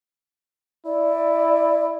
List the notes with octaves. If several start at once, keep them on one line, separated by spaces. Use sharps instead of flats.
E4 D5